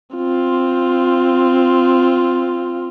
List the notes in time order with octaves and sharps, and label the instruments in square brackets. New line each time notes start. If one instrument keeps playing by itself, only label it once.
[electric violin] C4 F4